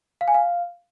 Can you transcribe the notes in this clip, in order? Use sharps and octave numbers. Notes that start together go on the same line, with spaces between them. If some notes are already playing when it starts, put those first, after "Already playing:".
F5
G#5
F5